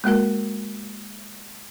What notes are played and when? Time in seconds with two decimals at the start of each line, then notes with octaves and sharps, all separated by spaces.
0.04 G#3 A#3 F#4 A#4